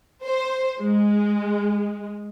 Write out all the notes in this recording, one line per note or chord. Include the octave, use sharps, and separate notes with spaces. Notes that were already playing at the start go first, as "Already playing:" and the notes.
C5
G#3